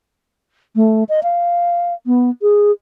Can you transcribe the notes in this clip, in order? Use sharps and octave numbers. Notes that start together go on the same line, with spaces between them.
A3
D#5
F5
B3
G#4